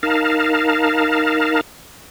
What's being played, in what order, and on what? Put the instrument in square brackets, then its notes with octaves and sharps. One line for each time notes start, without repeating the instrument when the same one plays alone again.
[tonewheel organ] D#4 A#4 F5 A5